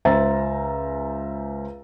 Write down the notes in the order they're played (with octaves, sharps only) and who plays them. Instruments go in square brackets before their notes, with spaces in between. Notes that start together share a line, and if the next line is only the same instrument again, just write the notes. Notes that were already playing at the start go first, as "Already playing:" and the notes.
[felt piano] C#2 C5 E5 A#5 A6